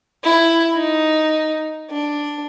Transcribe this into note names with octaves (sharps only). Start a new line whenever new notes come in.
E4
D#4
D4